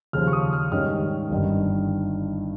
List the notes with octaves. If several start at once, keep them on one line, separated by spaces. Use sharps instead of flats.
D#2 C#3 F3 F6
C#6
D#6
F6
G#2 D#3 G3 C#4 F6
G1 G2 D#3